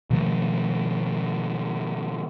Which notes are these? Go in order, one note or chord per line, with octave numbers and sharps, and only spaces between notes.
B2 D#3 F3 A3